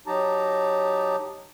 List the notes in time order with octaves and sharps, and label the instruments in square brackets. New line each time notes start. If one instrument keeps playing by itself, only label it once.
[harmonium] F#3 D#4 G4 A5 A#5